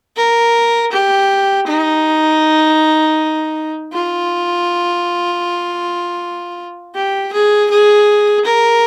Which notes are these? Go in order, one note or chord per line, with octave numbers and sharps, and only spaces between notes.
A#4
G4
D#4
F4
G4
G#4
G#4
A#4